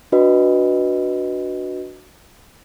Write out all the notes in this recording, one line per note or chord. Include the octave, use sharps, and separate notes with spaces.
D4 F#4 B4 D#5